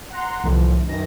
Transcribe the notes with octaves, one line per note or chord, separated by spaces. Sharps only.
F#5 A#5 C6
C2 A2 D3 E3 F3
F#2 D#3 E3 A#6